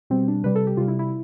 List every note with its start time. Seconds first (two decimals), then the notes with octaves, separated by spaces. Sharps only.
0.10 B2 G3 C4
0.28 D4
0.44 C3 G3 B4
0.55 A4
0.67 G4
0.77 C3 G3 F4
0.88 E4
0.99 E4